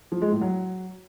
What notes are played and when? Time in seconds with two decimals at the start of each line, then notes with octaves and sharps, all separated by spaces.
0.12 F3
0.22 G#3
0.31 A2
0.41 F#3